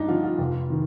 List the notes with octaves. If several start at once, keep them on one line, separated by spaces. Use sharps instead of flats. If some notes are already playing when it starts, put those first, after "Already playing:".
Already playing: G2 D4 D#4
D3 F3 F4
F4
F1
D#3